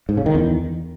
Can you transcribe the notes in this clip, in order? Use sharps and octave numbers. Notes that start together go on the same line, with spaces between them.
G#2
C#3
D#3
E2